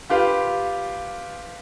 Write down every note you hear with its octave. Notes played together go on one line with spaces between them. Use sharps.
F4 G4 B4 F5